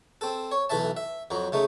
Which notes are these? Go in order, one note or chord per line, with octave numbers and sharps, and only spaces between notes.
C4 A4
C#5
B1 E3 A4 E5 A5
E5
F2 F#3 A#5
C#3 A3 D#4